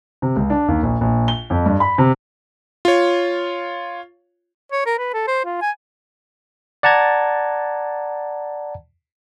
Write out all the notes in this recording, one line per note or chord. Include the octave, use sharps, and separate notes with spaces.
C3
C#2
D4
D#2
A#1
A#1
G7
F2
G2
B5
C3
F4 C#5
C#5
A#4
B4
A4
C5
F4
G#5
D5 F#5 A5 A#5 G#6